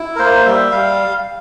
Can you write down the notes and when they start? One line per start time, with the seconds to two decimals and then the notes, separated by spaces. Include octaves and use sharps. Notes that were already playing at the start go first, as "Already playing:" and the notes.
Already playing: E4
0.16 A#4
0.19 A#3 C5
0.46 G3 E5
0.71 G3 F5